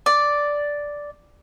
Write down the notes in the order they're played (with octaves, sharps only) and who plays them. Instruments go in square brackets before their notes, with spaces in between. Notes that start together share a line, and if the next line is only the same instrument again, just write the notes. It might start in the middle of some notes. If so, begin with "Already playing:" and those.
[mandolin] D5